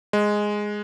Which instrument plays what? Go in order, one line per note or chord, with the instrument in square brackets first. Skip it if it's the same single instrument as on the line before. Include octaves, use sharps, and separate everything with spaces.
[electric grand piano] G#3